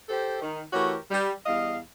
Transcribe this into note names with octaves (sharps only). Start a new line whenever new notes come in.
G4 A4 C5
D#3
E3 A3 F#4 G4 A#4 C#5
G3
E2 G3 D#5 F5